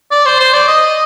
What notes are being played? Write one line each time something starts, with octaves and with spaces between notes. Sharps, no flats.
D5
C5
C5
D5
D#5